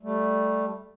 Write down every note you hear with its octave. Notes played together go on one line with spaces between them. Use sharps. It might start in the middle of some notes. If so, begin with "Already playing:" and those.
G3 A3